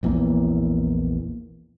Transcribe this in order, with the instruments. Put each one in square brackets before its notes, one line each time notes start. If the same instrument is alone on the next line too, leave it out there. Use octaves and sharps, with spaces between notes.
[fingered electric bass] A#1 E2 E3 A#3